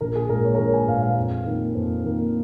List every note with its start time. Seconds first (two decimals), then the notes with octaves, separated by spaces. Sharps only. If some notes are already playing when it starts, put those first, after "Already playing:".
0.01 A#1 A#4
0.16 G#4
0.29 A#2 A#4
0.32 G#3
0.45 C#5
0.55 A#4
0.58 A#1 C#5
0.74 G#5
0.87 A#2 G#3 F5
1.02 F5
1.17 F2
1.46 D#3 A#3
1.75 F2
2.04 D#3 A#3